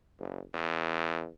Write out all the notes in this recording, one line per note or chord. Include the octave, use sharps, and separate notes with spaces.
F#1
E2